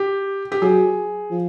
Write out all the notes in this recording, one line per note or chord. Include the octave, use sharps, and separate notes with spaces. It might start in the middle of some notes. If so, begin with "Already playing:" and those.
Already playing: G4
G4
F#3 G#4
F3